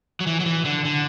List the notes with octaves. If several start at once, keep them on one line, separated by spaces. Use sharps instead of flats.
F#3
E3
F#3
E3
D3
D3